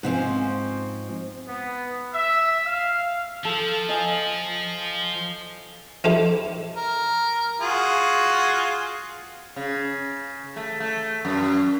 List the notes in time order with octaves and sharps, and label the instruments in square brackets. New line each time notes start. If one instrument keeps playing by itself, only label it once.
[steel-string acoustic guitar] G#2 F3 C4 C#4
[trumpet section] B3
E5
F5
[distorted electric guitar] F3 [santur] A4
[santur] D#5 G#5
[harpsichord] F3 D#4 E4 G4 A4 C5
[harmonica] A#4
F4 F#4 G#4
[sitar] C#3
A3
A3
F#2